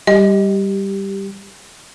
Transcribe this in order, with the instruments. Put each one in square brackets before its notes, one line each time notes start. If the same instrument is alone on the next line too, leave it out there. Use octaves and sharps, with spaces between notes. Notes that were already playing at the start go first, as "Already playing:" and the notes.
[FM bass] G3 [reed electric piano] G4 [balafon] D#5